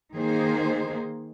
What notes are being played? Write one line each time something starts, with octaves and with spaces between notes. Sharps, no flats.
D#3 A#3 D#4 G#4 C5